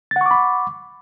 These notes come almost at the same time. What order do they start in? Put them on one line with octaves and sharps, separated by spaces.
A6 F#5 C#6 D6 B5